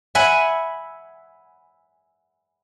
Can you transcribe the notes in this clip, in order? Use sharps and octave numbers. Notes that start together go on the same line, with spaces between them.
E5 F#5 G#5 B5